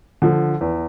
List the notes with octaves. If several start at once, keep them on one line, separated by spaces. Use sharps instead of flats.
D3 F3
E2